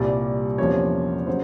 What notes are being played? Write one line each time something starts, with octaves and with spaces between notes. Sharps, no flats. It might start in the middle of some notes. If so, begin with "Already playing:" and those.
Already playing: C2 A#2 G3 D5
E2 C3 F3 A#3 C#4 C#5
C#3 F#3 C5